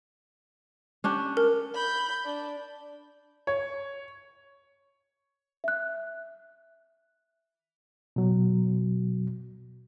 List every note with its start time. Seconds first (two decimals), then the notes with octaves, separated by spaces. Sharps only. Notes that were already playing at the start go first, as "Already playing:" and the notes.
1.04 C#4 D4 G4
1.37 A#4
1.75 B5 G6
2.25 D4
3.47 C#5
5.64 E5 F#6
8.16 B2 F#3